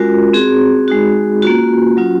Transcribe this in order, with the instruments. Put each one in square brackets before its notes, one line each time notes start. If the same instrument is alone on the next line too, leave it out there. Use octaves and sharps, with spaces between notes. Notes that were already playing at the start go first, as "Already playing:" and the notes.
Already playing: [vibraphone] G#3 C#4 F4 F#4 A#4
C4 F#4 G#4
G#3 D#4 F#4
A#3 C#4 F4 F#4
F#3 C#4 F4